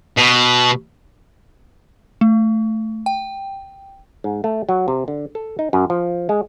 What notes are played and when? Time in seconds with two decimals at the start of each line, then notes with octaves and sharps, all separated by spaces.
0.17 B2
2.21 A3
3.06 G5
4.24 G#2
4.44 A3
4.69 F#3
4.88 C3
5.08 D3
5.35 A4
5.59 D#4
5.73 F#2
5.90 F3
6.29 G#3